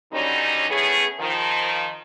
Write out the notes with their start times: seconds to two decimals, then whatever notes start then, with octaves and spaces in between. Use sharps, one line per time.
0.13 D3 D#3 F#3 G3 C#4 D#4
0.70 A2 A3 B3 C#4 G#4
1.19 D#3 F3